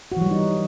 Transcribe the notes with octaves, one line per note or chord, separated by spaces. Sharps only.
E3 F#3 G3 D#4 F#4